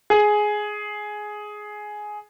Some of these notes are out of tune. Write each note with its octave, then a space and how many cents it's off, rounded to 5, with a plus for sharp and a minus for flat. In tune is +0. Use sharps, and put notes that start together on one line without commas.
G#4 +10